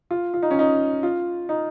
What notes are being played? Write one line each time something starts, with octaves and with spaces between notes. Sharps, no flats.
F4
F4
D#4
C#4
D#4
F4
D#4